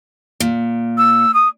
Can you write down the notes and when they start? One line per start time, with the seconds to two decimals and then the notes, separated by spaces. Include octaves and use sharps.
0.40 A#2
0.97 E6
1.34 D#6